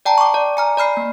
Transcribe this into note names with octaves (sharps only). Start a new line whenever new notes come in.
D5 G5 A5 A#5
C#6 D6
D5
G#5 A#5 F6
D5 B5 F6 C7
A#3